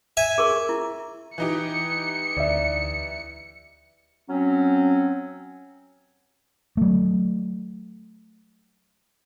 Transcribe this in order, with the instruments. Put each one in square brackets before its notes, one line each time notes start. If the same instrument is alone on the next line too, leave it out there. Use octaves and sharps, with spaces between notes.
[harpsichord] E5 G#5
[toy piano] G#4 A#4 C#6
E4
[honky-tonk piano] E3 D#4 G4 [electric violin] C#7
[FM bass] D2 [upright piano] D5 E5
[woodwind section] F#3 C4 C#4
[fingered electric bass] F#3 A3